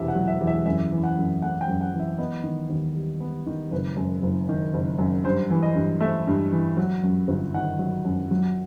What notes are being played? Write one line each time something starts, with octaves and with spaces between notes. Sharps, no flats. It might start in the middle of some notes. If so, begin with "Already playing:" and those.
Already playing: E1 E2 C3 E5
F#5
F#3
E5
E2
E5
F#2 E5
E3
F#5
F#2
A3 F#5
G5
F#2
F#5
E3
E5
B3 D#5
D#3
D#2
G3
B3
D#3
F#1 B4
F#2
F#1
D#3
F#1
F#2
G2 C5
E3
D#5
G2
A3 E5
G2
E3
F#3
F#2
G1
D#3 F#5
F#3
F#2
F#3